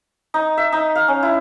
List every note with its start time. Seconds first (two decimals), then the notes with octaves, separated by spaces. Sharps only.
0.34 D#4
0.57 E5
0.72 D#4
0.95 F5
1.08 C#4
1.23 E4